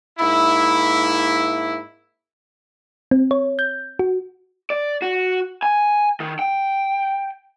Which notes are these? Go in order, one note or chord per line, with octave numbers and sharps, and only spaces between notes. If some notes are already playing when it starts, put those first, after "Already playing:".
G#2 A#3 E4
C4
C#5
G6
F#4
D5
F#4
G#5
D#3
G5